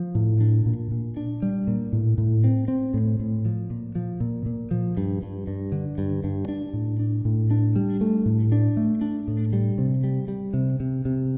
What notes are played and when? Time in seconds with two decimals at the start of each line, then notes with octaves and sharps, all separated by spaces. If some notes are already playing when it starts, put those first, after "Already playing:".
Already playing: F3
0.15 A2
0.41 D4
0.66 A#2
0.91 A#2
1.17 D4
1.42 G3
1.67 A#2
1.93 A2
2.18 A2
2.44 C4
2.68 C4
2.94 A2
3.20 A2
3.45 F3
3.70 A#2
3.95 F3
4.20 A#2
4.46 A#2
4.71 F3
4.97 G2
5.23 G2
5.47 G2
5.72 D3
5.98 G2
6.24 G2
6.49 D4
6.73 A2
6.99 D4
7.25 A2
7.51 D4
7.76 G3
8.01 A3
8.26 A2
8.52 D4
8.77 A3
9.01 D4
9.28 A2
9.53 G3
9.78 C3
10.04 G3
10.28 G3
10.54 C3
10.80 C3
11.05 C3